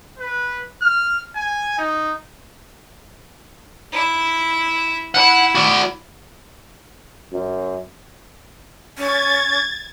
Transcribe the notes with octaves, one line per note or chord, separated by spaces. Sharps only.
B4
F6
G#5
D#4
E4 E5
E4 F#5
F#4 D5
F#2
C#4 G#6 A6